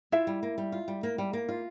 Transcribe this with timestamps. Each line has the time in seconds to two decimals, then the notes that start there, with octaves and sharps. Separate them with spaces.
0.12 E4 F4 E5
0.27 G3
0.43 A#3
0.58 G3
0.72 F4
0.88 G3
1.03 A#3
1.18 G3
1.33 A#3
1.49 F4